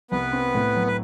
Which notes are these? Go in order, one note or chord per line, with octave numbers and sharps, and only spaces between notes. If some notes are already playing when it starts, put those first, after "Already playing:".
C2 B3 B4
C4
A2
F#3
B4